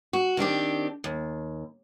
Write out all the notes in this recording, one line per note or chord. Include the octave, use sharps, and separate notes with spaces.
F#4
D#3 C4 D4 G4
D#2